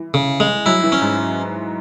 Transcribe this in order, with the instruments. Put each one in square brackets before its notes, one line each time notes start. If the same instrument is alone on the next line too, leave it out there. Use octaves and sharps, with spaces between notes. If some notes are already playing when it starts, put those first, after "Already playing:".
Already playing: [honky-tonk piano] E3
[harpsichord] C#3
G#3
[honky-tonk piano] F#3 [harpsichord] E4
[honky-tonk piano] E3
[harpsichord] C#4
[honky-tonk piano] G#2